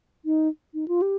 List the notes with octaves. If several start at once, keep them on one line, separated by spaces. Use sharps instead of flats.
D#4
D#4
F4
G4